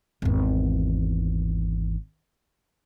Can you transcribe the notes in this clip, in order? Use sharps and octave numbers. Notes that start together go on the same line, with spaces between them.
G#1 E2